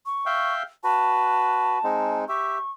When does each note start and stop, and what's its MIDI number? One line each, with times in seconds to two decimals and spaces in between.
0.06 0.54 85
0.26 0.63 76
0.26 0.63 77
0.26 0.63 79
0.84 1.78 66
0.84 1.78 71
0.84 2.18 81
1.84 2.25 56
1.84 2.25 60
1.84 2.25 63
2.29 2.58 67
2.29 2.58 76
2.29 2.71 85